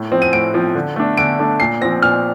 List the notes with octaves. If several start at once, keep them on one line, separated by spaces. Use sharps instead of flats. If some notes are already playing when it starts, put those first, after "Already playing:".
Already playing: A2
F3 C4
D#7
A2 D7
F3 C4
D3
A3 D4
D3 D7
A3 D4
A#2 C7
F3 C4 A#6
A#2 F6